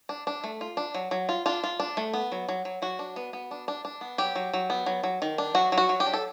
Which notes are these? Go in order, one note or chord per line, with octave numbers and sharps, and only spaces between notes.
D4
D4
A3
F4
D4
F#3
F#3
F4
D4 F4
F4
D4
A3
B3
F#3
F#3
F#3
F#3 F#4
D4
B3
B3
D4
D4
D4
B3
F#3 G4
F#3
F#3
B3
F#3
F#3
D#3
D4
F#3 F#4
F#3
F#4
F#3
G4
D4
A4